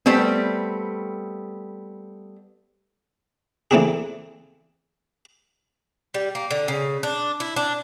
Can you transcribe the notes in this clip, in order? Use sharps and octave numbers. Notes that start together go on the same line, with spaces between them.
G3 A3 B3 C4
E3 A3 A#3 C4 D4 G#4
G3
A#3
D3
C#3
D4
E4
D4